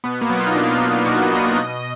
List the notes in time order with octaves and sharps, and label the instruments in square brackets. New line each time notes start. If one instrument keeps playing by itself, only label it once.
[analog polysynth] B2 B3
A#3
F#3 B3
F4
D#4
B2 D4
B2 F4
B2 F#4
F#3 D#5
B2